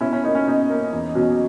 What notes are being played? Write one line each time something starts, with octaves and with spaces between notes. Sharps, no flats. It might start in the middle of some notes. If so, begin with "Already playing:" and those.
B2 C#4 E4
C#4
A#3 C#4 D#4
C#4
B2 D#4
A#3 C#4
E2
B2 F#3 C#4